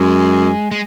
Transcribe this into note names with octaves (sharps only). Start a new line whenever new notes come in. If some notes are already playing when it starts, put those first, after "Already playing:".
Already playing: F#2 G#3
G#3